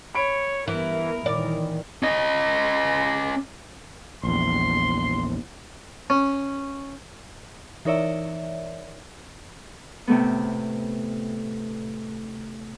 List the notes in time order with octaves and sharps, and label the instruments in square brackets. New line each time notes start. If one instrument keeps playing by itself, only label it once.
[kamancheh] C#5 [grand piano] B5 D7
[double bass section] G2 G3 B3 [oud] E3 [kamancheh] A#4
[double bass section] A#2 D#3 E3 [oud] D5
[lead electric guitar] C#4 D#5
[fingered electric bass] A#1 E2 [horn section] C6
[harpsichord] C#4
[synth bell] E3 D#4 A#4 C#5 D5 E5
[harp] A2 C3 A3 B3